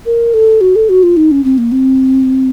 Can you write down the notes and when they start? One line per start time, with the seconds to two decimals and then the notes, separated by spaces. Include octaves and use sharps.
0.06 A#4
0.34 A4
0.61 F#4
0.76 A4
0.89 F#4
1.03 F4
1.17 D#4
1.31 C#4
1.44 C4
1.58 A#3
1.72 C4